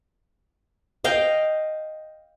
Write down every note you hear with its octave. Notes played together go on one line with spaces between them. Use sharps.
D#5 F5 G5